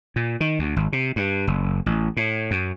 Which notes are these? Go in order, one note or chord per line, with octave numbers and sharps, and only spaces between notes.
A#2
D#3
D2
G#1
C3
G2
F#1
A1
A2
F#2